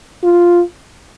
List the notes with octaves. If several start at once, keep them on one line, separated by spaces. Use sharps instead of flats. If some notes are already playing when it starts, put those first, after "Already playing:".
F4